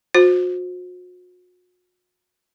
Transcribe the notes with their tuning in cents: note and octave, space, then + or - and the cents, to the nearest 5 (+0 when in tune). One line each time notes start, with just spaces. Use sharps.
F#4 -40 C5 +0